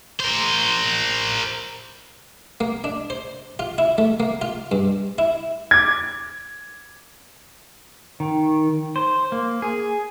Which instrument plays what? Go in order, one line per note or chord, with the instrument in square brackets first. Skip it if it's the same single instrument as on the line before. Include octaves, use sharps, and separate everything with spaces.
[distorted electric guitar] A#4 C5
[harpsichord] A#3
D4
C5
F4
E4
A3
A#3
F4
G2
E4
[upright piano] D6 G#6
[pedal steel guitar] D#3
C5
A#3
G#4